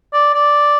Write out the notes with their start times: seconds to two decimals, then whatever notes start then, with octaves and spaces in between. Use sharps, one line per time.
0.13 D5
0.34 D5